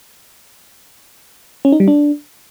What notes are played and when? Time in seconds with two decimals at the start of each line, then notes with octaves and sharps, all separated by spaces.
1.65 C#4
1.72 D#4
1.80 G3
1.88 D4